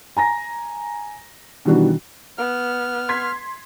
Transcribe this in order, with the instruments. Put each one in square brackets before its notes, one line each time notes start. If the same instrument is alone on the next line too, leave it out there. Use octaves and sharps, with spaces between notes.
[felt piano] G#5 A#5 A#6
B2 D#3 E3 G3 D4 F#4
[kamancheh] B3 [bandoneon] F6
[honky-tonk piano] C6 G#6 B6